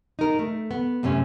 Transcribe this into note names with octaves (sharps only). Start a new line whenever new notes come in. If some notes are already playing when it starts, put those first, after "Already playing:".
D#4 A#4
A3
B3
F#2 C3 A3 C#4